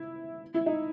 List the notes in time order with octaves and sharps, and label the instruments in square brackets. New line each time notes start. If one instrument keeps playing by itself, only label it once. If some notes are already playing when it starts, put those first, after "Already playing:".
Already playing: [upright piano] E4
E4
D#4